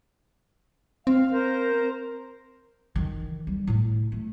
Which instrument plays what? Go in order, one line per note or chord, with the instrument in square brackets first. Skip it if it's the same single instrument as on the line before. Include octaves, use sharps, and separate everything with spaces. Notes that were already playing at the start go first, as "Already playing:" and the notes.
[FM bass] C4 [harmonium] F5
[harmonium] A#4 C5
[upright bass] D#3 E3
G3
A2
A3